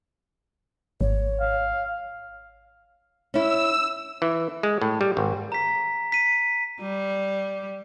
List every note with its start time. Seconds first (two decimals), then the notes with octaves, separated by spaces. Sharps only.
1.01 G#1 C#5
1.41 F5
3.34 C#4 E4 E6
4.22 E3
4.63 G#3
4.82 A2
5.01 G3
5.17 G#1
5.52 A#5 B6
6.12 B6 D#7
6.81 G3